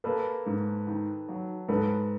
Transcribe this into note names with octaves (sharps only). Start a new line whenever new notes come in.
A#3 A4 B4
G#2
D#3
F#3
G#2 A4 B4